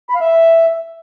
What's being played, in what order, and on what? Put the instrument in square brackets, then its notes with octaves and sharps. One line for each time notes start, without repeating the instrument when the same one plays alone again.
[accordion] B5
F5
E5